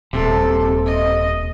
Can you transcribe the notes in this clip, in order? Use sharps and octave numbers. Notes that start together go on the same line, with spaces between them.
D#1 C3 A4
D#5